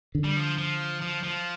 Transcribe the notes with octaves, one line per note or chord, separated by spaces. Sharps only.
D3
G3
F3
F3
F3
F3